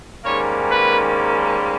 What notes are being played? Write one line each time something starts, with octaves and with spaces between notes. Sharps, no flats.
G#2 D#3 G3 A#3 C#4 C#5
B4